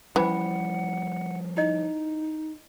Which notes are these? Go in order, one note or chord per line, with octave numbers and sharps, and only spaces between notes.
E3 F3 G3 C#4 C5 F#5 B5
D#4 E4 D#5